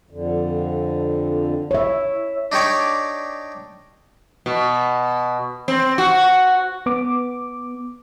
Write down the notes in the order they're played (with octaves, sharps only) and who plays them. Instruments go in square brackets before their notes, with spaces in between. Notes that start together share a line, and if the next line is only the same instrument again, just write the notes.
[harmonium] F2 D3
[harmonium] E4 [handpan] C#5 E5
[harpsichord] D4 D#4 G4 C#5 D5
[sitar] B2
C4
F#4
[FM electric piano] B3 D6